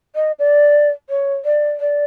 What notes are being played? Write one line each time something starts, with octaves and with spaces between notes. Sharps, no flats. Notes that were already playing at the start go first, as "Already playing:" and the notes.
D#5
D5
C#5
D5
D5